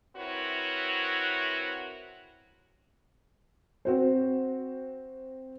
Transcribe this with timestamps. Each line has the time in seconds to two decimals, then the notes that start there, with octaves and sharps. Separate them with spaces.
0.16 C4 E4 F#4 A#4 B4 C#5
3.85 C4 F#4 C5